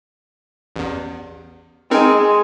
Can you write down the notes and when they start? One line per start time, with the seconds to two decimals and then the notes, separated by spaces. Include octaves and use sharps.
0.76 A1 E2
1.91 G#3 C4 D#4 A#4